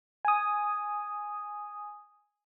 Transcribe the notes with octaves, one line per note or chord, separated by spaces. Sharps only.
G#5 D#6